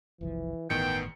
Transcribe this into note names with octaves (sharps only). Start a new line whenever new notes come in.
F#1 C2 E3 F3
G1 E2 A2 D#3 E3 B3 G5 C#7